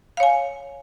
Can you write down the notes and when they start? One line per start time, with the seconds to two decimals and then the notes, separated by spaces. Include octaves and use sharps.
0.17 F5
0.20 C#5
0.23 G#5